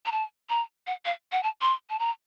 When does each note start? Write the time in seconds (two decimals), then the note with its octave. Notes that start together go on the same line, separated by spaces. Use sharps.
0.06 A#5
0.12 A5
0.50 A#5
0.87 F#5
1.05 F5
1.32 F#5
1.43 A5
1.61 C6
1.90 A5
1.99 A#5